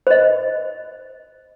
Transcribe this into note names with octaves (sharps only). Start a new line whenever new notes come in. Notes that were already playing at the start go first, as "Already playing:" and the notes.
C5 D#5